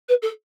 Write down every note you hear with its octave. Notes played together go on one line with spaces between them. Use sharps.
B4
A4